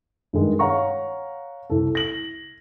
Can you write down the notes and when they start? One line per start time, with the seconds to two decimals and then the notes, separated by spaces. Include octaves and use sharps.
0.33 G2 D#3 G#3
0.59 C#5 F5 F#5 A#5 C#6
1.70 C2 A4
1.95 A#6 F#7